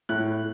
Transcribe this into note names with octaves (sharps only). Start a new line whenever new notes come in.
A2 F#6